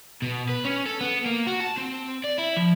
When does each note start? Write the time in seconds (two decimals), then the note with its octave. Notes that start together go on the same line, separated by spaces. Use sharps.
0.22 B2
0.49 B4
0.64 C#4
0.86 A4
1.01 B3
1.26 A#3
1.47 F#4
1.61 A5
1.78 C4
2.25 D5
2.39 E4
2.57 F3